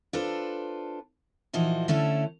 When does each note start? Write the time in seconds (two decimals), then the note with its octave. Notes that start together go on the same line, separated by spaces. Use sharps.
0.13 D4 F4 A4 B4 C5
1.53 A#2 E3 F3 D#4 F#4
1.88 D3 A3 C#4 E4 A4